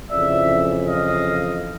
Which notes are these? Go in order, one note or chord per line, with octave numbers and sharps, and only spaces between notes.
F2 C#3 E3 D5 E5
D#5 F5